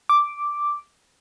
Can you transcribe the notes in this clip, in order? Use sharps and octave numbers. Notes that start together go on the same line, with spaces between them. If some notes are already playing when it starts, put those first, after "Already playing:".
D6